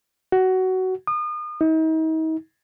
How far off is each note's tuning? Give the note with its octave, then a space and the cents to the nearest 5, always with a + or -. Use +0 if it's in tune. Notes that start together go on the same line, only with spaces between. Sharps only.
F#4 +15
D#6 -35
D#4 +40